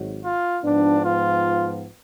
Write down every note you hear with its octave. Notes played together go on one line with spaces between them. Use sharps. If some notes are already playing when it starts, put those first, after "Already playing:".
Already playing: G#1 G#2 F#3
F4
G#2 F3 B3 D4
F4